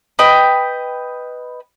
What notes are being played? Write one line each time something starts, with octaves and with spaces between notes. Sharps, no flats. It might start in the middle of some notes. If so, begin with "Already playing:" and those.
B4 D#5 G5